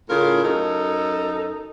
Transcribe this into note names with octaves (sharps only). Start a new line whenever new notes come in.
A2 C#3 F4 A#4
F#2 D#4 A4